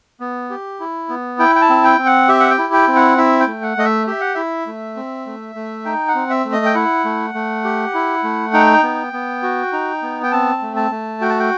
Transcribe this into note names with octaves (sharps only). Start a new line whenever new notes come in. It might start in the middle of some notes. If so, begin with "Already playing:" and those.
B3
G4
E4
B3
E4 G5
G5
A5
C4
G5
C4
F#5
G4 E5
F#5
G5
E4
G5
C4
F#5
E4 E5
G5
A3
F#5
A3 D#5
E5
G4 E5
F#5
E4 E5
A3
C4
A3
A3
D#4 G5
F#5
C4
E5
A3
D#5
G5
E4 F#5
A3
A3
G4
E4
A3
D#4 G5
B3
B3
F#4
D#4
B3
G5
C4 A5
A3
A5
A3
F#4 G5
A5
G5